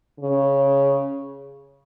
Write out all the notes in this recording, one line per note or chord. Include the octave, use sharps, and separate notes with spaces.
C#3